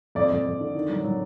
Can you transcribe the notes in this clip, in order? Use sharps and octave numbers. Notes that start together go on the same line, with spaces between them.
F2 D5
F2
F2
D3
D#3
F#3
F#3